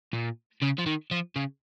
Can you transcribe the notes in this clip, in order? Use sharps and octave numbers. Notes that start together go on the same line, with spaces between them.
A#2
C#3
F3
D#3
F3
C#3